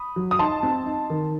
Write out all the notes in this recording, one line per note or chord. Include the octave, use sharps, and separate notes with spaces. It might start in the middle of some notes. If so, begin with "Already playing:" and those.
Already playing: B5 D#6
F#3
D#6
D#4 A5 C6
C4
D#4
D#3